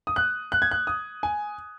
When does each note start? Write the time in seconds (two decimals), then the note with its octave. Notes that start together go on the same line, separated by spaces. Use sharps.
0.07 D#6
0.16 F#6
0.52 F#6
0.62 G#6
0.71 F#6
0.87 D#6
1.23 G#5